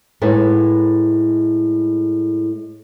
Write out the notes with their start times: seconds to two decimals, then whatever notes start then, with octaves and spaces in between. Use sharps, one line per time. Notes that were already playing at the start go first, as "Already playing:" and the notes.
0.22 A2 G#3 A3 D#4 B4 F#5